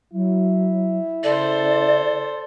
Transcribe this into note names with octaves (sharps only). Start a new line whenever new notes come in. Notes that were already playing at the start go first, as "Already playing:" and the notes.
F#3 E4
C#3 A4 C5 D5